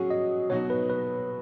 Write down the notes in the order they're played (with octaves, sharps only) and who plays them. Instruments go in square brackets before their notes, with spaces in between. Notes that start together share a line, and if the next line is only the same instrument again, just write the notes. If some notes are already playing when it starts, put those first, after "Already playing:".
Already playing: [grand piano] F#3 C#4 G#4 [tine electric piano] F#4
[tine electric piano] D#5
[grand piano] B2 F#3 D#4 F#4 [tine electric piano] C#5
[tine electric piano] B4
B4